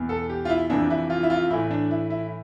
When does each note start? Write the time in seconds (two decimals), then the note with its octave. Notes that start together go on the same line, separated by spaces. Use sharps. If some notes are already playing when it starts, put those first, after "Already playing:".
Already playing: E2 B2
0.09 A4
0.30 G4
0.45 F4
0.49 E4
0.70 F2 C3 E3 D4
0.90 E4
1.10 F4
1.23 E4
1.30 F4
1.50 A2 E3 E4
1.71 D4
1.91 E4
2.10 E4